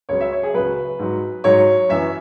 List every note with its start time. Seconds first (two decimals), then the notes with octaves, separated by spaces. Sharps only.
0.09 C#2 C#3 F#3 C#5
0.20 E5
0.32 C#5
0.43 G#4
0.54 C#2 C#3 F#3 B4
0.99 G#2 F#3
1.44 G#2 F#3 C#5
1.89 F#2 E3 E5